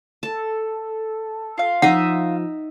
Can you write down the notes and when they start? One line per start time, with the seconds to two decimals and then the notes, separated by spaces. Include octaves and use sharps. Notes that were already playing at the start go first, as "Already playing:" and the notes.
0.23 A4 A5
1.58 F4 F5
1.82 F3 D#4 D#5 E5 F#5